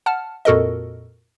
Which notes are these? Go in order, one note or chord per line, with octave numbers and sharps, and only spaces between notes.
F#5 A5 F6
F2 A#2 F#4 A4 A#4 D#5